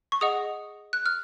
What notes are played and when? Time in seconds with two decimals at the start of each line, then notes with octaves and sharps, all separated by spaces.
0.12 C#6
0.21 G#4 D#5 F#5 D#6
0.93 F#6
1.06 F6